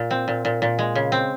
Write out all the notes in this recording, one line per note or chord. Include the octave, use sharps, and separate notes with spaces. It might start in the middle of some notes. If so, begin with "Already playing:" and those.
Already playing: A#2
C4
A#2
A#2
A#2
G#3
C#3
C4